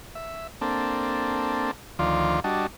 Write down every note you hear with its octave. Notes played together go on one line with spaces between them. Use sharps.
E5
A#3 C4 D4 A4
D2 D#3 F3 F4 D5
G3 D4 F#4 D#5 A5